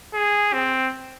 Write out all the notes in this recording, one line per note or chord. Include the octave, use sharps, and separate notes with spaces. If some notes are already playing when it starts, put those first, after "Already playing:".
G#4
C4